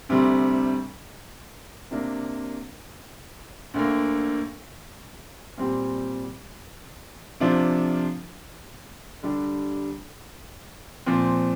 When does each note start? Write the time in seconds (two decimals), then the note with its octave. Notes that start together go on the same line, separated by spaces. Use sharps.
0.09 D2 C3 G3 C4
1.91 C3 A#3 D4
3.74 D2 D3 A#3
5.58 A#2 G3 C4 G4
7.40 C3 F3 D4 F4
9.23 D3 G3 D4 G4
11.06 A#2 F3 C4